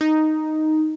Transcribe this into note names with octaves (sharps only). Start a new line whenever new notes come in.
D#4